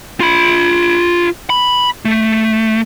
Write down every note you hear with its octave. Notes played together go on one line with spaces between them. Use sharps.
F4 B5
B5
A3